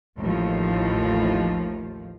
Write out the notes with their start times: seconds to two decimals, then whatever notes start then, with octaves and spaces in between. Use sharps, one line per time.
0.18 A1 D#2 A2 F3